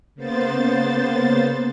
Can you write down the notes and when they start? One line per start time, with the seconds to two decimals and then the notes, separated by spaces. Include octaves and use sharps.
0.15 C#3 A#3 B3 C5 A6